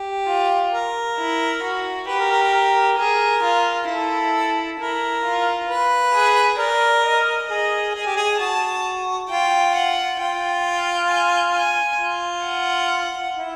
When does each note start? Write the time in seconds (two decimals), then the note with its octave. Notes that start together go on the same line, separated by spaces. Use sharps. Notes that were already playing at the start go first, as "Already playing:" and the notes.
Already playing: G4
0.28 F4
0.73 A#4
1.18 E4
1.63 F#4
2.08 G4 B4
2.19 A#4
2.31 A#4
2.42 A#4
2.54 A#4
2.98 G#4 A#4
3.44 F4
3.89 E4 A4
4.79 E4 A#4
5.24 F4
5.69 B4
6.14 G#4
6.59 A#4 D5
7.04 D#5
7.49 G#4 D#5
7.94 G#4 G#5
8.06 G4
8.16 G#4
8.39 F#4 A5
9.29 F4 G5
9.75 F#5
10.19 F4 G5
10.65 G5
11.10 G#5
11.55 G#5
12.00 F4
12.46 F#5
13.36 E4